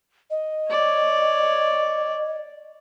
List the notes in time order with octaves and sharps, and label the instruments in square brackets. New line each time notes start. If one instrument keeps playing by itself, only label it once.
[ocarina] D#5
[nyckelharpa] C#5 D5